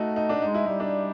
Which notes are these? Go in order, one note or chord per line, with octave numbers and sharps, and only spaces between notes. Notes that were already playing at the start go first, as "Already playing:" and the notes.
Already playing: A3 D#4 F#4
D#4
D4
G#3 D#4
E4
G3 D#4
D4